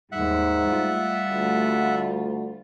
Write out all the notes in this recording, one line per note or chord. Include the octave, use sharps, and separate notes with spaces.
D#2 G#2 G3 E5 F#5
G3 A3 F4
D2